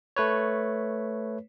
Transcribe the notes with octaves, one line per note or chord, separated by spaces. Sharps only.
A3 B4 C#5